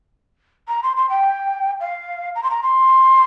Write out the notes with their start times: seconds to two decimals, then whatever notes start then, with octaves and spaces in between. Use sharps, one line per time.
0.68 A#5
0.83 C6
0.97 C6
1.09 G5
1.80 F5
2.35 A#5
2.43 C6
2.50 A#5
2.63 C6